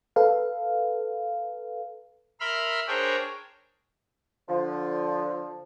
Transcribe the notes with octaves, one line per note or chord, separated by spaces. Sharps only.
A4 B4 F5
A#4 E5 B5 C6 F6
D4 G#4 A#4 C5 C#5 G5
D3 F3